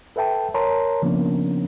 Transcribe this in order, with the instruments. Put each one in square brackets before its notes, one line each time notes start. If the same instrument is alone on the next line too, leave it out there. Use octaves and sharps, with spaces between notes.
[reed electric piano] A4 B4 E5 G5 A5
A#4 C#5 A5 A#5 C6
C#3 F3 A#3 B3 C#4 D4